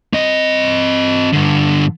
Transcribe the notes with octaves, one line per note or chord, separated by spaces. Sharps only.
C4 D#5
G2 D3